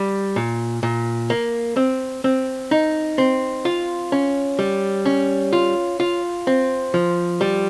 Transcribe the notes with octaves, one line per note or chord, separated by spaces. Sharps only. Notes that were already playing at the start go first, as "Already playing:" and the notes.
Already playing: G3
A#2
A#2
A#3
C4
C4
D#4
C4
F4
C#4
G3
C#4
F4
F4
C4
F3
G3